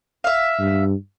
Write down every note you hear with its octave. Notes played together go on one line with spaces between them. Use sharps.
E5 F5
G2